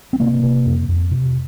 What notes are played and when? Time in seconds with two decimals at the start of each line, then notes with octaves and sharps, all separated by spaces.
0.13 C4
0.20 C3 A#3
0.43 C3
0.66 F2
0.88 F2
1.11 C3